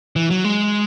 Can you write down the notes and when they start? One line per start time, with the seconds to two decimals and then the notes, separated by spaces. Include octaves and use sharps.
0.16 E3
0.30 F#3
0.44 G#3